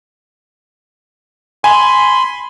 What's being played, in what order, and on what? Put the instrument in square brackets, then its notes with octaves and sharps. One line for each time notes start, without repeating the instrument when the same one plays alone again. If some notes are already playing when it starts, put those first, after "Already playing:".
[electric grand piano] G#5 [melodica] B5 C6